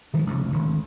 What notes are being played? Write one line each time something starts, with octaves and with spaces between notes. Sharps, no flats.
D#3 F3 G3 G#3
F1 C#2
G#1 D2